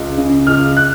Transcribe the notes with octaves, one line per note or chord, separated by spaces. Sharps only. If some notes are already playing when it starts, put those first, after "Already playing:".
Already playing: C#2
C#3
C#2 F6
F#6